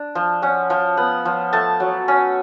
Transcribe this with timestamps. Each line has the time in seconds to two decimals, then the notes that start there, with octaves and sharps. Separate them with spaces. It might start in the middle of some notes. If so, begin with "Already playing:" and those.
Already playing: D4
0.15 F3
0.42 C#4 F#5
0.70 F3
0.97 B3 F#5
1.25 F3
1.53 A3 A5
1.80 F#3
2.08 C#4